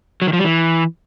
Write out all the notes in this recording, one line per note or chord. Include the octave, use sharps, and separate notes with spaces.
F#3
D#3
F3
G3
E3